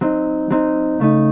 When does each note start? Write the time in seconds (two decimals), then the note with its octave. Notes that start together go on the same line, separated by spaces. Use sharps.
0.01 F#3 C4 D#4
0.51 F#3 C4 D#4
1.00 C#3 A3 D#4